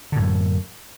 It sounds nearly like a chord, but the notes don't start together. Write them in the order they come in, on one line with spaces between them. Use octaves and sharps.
D3 A2 F#2